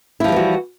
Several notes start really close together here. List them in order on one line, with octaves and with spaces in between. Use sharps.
E4 F3 G3 E3 F#4